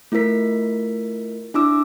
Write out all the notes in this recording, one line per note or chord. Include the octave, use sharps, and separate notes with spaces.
A3 E4 F4 A#4 B6
D4 E4 D6 E6